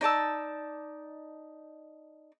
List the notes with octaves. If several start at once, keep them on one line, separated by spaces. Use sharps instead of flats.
D#4 D5 A5 E6